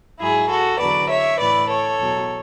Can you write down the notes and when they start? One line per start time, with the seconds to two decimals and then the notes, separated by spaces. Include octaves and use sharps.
0.19 G#2 F#3 E4 G#4
0.49 F#4 A4
0.78 E2 D3 F#3 B4 D5
1.09 C#5 E5
1.38 A2 E3 B4 D5
1.68 A4 C#5
1.98 E2 B2 F#3